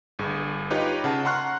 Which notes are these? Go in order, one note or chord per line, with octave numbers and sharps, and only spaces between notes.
G1 G2 G#4
D#4 F4 G4 B4 C#5 D#5
C#3 F#5 A5
F#5 A#5 C6 C#6 F6 F#6